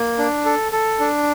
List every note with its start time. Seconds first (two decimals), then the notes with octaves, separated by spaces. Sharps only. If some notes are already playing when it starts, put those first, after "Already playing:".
Already playing: A#3
0.18 D4
0.45 A4
0.72 A4
1.00 D4